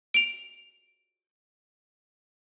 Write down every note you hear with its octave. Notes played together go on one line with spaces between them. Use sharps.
D7 F7